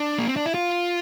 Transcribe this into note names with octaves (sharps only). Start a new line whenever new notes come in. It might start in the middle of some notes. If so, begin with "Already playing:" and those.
Already playing: D4
A#3
C4
D4
E4
F4